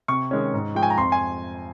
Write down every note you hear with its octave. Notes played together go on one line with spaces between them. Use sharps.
C3 C#6
D#3 G#3 C#4
G#2
F3 G#3 G5
G#5
A#5
F2 C6
G#5